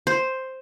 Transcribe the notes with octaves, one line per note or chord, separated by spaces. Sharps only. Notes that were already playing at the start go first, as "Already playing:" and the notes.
C5